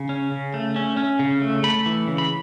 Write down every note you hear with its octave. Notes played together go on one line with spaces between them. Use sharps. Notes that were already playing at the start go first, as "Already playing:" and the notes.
Already playing: C#3
C#4
C#3
A3
C#4
C#4
C#3
A3
A3 B5
E3
C#3
B5